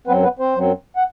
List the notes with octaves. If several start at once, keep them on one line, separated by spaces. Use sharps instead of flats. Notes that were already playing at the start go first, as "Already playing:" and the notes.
F#2 F#3 B3 C4 B4
B3 B4
C4 C5
F#2 F#3 C4
F#5